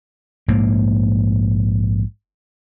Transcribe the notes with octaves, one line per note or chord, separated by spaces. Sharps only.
A#1 G#2 A#3